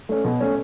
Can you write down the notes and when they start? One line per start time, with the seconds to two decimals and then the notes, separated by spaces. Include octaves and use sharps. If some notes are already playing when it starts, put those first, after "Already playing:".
0.09 A3 C#4
0.25 B2
0.41 A3 C#4